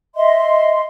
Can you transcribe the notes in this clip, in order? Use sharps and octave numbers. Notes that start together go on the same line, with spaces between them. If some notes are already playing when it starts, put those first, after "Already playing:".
D#5 E5 C6